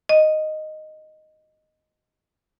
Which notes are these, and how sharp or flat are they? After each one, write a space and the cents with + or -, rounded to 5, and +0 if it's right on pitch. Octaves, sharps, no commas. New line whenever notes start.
D#5 -5